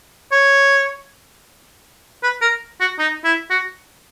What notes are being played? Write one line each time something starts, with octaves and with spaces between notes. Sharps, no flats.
C#5
B4
A#4
F#4
D#4
E4
F#4